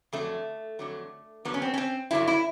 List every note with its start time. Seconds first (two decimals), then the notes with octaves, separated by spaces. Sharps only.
0.13 F2 D3 F#3 A3
0.79 F2 D3 F#3
1.45 G2 D3 F#3 B3
1.54 C#4
1.62 C4
1.74 C#4
1.78 C4
2.11 G2 D3 F#3 E4
2.27 E4